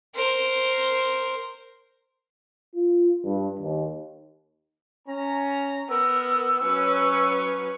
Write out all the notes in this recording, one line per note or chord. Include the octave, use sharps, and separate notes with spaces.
A#4 C5
F4
G2
D#2
C#4 A#5
B3 A#4 E6
F#3 C#4 B4 C#6